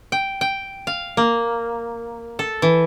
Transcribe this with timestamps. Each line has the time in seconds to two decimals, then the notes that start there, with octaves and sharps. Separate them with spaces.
0.12 G5
0.41 G5
0.87 F5
1.17 A#3
2.39 A4
2.62 E3